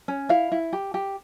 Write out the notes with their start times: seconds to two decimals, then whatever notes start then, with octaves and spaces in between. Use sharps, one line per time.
0.08 C#4
0.29 E4 F5
0.52 E4
0.73 G4
0.94 G4